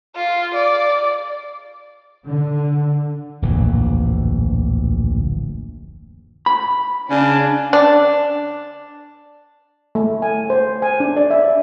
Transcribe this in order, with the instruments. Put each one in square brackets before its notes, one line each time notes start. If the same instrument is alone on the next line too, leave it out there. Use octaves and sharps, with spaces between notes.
[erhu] F4
D5
[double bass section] D3
[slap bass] D1 A#1 F2 E3
[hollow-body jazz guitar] B5
[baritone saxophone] C#3 [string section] D4
[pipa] D4
[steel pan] A3
G#5
C5
G#5
D4
D5
E5